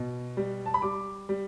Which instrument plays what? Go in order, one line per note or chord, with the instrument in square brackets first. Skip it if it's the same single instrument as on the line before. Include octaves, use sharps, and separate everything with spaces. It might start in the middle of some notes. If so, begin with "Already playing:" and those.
Already playing: [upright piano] B2
G3
A5
B5
G3 D6
G3